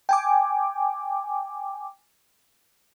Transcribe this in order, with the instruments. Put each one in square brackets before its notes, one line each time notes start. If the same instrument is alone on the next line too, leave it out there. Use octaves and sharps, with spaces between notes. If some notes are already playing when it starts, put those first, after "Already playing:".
[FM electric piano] G5 G#5 D6